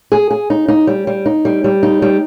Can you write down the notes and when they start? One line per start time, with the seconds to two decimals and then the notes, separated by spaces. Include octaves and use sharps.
0.12 G#4
0.31 G#4
0.50 D#4
0.68 D#4
0.87 G3
1.07 G3
1.26 D#4
1.45 G3
1.64 G3
1.83 D#4
2.02 G3